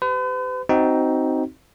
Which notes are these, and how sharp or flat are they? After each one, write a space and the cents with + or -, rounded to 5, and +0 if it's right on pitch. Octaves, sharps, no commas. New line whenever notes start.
G4 +0 B4 +45
C4 +0 D#4 +5 F#4 +25